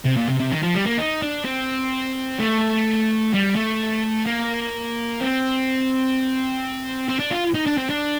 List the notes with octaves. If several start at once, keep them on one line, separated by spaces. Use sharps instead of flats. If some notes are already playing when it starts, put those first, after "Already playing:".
C3
A#2
C3
C3
D#3
F3
G3
A#3
D#4
D4
C4
A3
G3
A3
A#3
C4
C4
D4
F4
D#4
D4
C4
D4